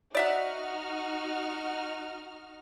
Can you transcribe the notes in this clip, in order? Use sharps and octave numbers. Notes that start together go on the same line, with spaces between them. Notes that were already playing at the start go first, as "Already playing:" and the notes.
D#4 F#4 D5 E5 F#5 F6